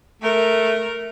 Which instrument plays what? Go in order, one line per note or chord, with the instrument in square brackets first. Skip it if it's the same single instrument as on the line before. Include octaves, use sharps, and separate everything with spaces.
[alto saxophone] A3 [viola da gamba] A#4